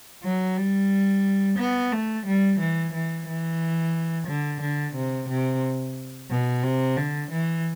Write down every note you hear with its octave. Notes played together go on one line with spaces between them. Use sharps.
F#3
G3
B3
A3
G3
E3
E3
E3
D3
D3
C3
C3
B2
C3
D3
E3